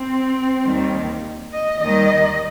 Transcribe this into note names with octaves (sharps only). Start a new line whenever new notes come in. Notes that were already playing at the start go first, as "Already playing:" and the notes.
Already playing: C4
D#2 D#3 G3
D#5
D#2 D#3 G3 D#5